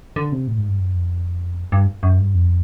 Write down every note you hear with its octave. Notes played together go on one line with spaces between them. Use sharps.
D3
C3
A2
G#2
G2
F#2
F2
G2
F#2
G2
F2